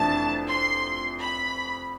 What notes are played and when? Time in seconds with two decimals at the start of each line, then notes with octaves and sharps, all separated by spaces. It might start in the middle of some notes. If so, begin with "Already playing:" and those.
Already playing: F1 F2 E3 A3 D4 A5
0.47 C6
1.19 B5